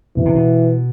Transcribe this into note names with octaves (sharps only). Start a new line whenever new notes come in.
B2 E3
C3
B2